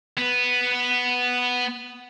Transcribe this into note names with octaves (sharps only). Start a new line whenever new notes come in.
B3 B4